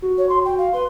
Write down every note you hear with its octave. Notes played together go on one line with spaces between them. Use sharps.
F#4
C#5
C6
G5
F5
B4 C6